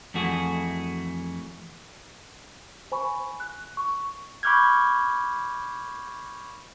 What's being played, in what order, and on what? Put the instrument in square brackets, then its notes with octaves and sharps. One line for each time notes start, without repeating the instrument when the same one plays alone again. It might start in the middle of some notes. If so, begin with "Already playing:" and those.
[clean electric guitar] F2 E3 A3 F#4 G#4
[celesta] C5 G#5 B5 C#6
F#6
C#6
[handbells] B5 C#6 D6 F6 G6 G#6